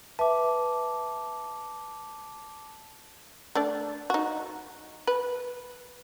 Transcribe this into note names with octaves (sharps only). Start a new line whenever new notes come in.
B4 E5 A5 D6
A3 D4 D5
D#4 F#4
B4